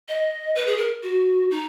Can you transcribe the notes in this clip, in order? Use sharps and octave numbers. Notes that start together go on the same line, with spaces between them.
D#5
B4
G#4
A#4
F#4
D#4